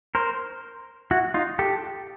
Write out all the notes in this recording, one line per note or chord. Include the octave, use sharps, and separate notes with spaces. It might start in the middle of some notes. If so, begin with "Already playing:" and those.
A#4 C5
E4 F#4
D#4 F4
G4 A4